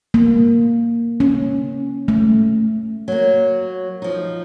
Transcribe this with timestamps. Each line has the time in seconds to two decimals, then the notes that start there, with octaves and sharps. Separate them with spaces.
0.14 A#3
1.20 C#4
2.08 A3
3.08 F#3 A#3
4.02 F3 D#4